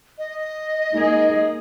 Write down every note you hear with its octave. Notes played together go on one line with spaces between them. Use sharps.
D#5
G#3 A#3 D#4 G#4